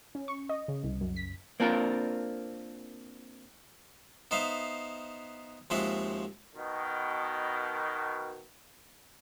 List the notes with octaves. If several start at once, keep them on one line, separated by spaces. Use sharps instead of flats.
C#4
C#6
D#5
C#3
C2
F#2
B6
A#3 C4 D4 F4 A#4
B3 D#4 C5 E5 F5
D#2 F3 G#3 C4 F#4 E5
B2 D#3